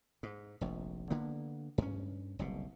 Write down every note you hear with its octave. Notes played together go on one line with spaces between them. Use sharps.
G#2
F1 A#1
D3 A#3 B3
G2 C#4
F#1 C2 B2